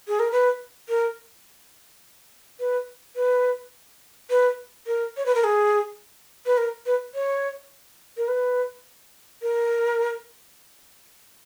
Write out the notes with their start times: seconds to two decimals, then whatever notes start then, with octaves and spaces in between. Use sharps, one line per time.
0.08 G#4
0.19 A#4
0.32 B4
0.89 A#4
2.60 B4
3.16 B4
4.30 B4
4.87 A#4
5.17 C#5
5.26 B4
5.35 A#4
5.44 G#4
6.46 B4
6.57 A#4
6.86 B4
7.14 C#5
8.17 A#4
8.28 B4
9.42 A#4